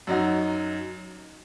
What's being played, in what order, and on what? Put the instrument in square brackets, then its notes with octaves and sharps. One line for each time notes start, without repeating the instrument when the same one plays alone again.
[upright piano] F#2 F#3 D#4 F#4